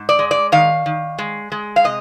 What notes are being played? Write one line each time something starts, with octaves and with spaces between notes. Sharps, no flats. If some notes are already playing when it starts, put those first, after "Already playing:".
Already playing: G#2
D5
G#3
D5
D#3 F5
D#3
G#3
G#3
F5
C3 D#5